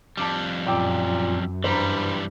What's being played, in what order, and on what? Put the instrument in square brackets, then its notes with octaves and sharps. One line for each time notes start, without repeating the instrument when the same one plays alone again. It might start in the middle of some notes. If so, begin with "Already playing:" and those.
[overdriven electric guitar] F2 G3 [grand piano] A5 D6
[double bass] F#2 [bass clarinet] A#2 [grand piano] G5 D6 E6
[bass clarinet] G2 [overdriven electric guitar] E3 G3 [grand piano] C5 A#5 B5